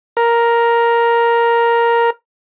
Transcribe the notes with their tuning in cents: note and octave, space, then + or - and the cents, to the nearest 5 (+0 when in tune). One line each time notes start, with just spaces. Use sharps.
A#4 +5